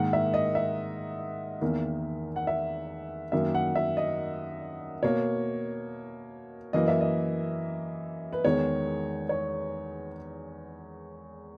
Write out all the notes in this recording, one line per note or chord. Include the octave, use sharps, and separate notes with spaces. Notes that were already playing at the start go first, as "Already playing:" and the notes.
Already playing: G#2 D#3 A#3 F#5
E5
D#5
E5
E2 D#3 A#3
F#5
E5
F#2 D#3 A#3 E5
F#5
E5
D#5
B2 A#3 C#5
F#2 E3 A#3 D#5
E5
D#5
B4
E2 D#3 G#3 B3 C#5
C#5